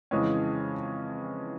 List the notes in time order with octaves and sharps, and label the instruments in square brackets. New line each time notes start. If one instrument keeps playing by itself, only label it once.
[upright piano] F2 C#3 E3 G#3 C#4